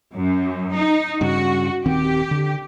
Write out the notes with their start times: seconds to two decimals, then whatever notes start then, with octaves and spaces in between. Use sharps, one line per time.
0.14 F#2
0.74 D#4
1.21 G2 C#3 F#4
1.86 D#1 D#3 C4 G4
2.31 D3